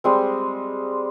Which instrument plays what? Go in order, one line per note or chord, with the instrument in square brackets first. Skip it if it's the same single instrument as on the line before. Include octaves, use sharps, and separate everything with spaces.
[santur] G3 G#3 C4